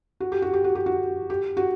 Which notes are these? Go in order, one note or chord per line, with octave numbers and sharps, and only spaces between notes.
F#4
G4
F#4
G4
F#4
G4
F#4
G4
F#4